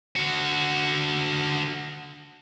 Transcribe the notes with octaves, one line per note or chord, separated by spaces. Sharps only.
D3 F#4